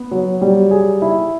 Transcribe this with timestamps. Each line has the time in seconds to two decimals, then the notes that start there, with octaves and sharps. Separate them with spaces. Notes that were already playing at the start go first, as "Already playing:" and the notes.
Already playing: B3
0.11 F#3
0.42 G3
0.71 G#4
1.02 E4